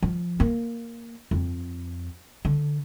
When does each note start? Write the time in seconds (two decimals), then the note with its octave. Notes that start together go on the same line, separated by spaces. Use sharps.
0.03 F3
0.40 A#3
1.31 F2
2.45 D3